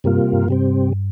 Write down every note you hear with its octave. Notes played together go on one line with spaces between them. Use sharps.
G2 C3 G3 A#3 F4
G2
C3 G3 C4